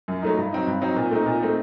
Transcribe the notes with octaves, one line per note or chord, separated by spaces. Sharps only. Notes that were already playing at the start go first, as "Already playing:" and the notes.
F#2
F#3 A3 D#4
G2
F#3 C4 D#4
G2
F#3 C4 D#4
A#2
A3 C4 D#4
A#2
A3 C4 D#4